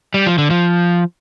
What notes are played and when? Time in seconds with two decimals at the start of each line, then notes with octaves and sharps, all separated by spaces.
0.14 G3
0.27 F3
0.38 D3
0.50 F3